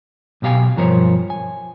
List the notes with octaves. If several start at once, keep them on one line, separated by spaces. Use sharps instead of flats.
B1 B2 G4 F5 G#5
B1 G2 F3 A#4 C5 C#5
G#5